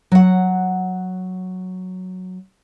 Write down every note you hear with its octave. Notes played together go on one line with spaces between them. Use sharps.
F#3 F#5